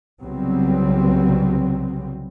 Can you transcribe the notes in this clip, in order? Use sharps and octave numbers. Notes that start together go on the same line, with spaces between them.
C2 C#3 F#3 G3 B3 C4